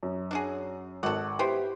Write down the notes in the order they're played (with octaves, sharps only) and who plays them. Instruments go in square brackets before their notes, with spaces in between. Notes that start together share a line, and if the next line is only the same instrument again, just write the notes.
[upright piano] F#2
[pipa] D4 F#4 G#4
[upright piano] G#1 [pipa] A4 F#5
[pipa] B3 E4 C5 [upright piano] G4